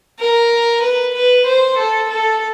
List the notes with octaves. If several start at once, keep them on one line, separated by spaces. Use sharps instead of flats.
A#4
B4
B4
C5
A4
A4